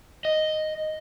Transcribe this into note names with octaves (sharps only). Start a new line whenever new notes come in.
D#5